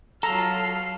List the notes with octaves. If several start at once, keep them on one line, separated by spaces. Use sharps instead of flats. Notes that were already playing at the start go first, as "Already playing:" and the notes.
F#3 F4 A4 A#5 F6 C7